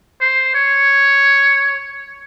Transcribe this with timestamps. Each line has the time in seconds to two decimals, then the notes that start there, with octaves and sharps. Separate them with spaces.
0.20 C5
0.54 C#5